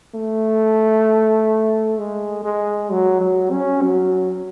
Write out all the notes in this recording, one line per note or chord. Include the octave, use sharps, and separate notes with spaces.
A3
G#3
G#3
F#3
F#3
C#4
F#3